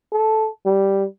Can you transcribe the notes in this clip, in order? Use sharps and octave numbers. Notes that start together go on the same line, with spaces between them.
A4
G3